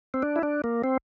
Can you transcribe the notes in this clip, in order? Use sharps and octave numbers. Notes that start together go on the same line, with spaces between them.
C4
D4
E4
D4
A#3
C4